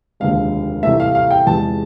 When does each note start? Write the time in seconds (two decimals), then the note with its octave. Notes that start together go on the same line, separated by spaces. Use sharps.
0.20 F1 D#2 D3 F3 G#3 F5
0.83 C2 C3 E3 A3 E5
1.00 F5
1.15 F5
1.31 G5
1.47 E2 C3 F3 G#3 A5